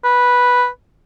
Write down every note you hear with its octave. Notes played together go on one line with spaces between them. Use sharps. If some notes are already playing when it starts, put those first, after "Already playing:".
B4